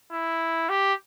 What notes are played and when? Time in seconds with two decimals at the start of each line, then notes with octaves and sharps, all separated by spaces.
0.12 E4
0.69 G4